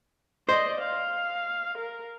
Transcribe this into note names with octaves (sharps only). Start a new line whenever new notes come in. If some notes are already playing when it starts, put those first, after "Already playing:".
C5 D5 D#5
F5
A#4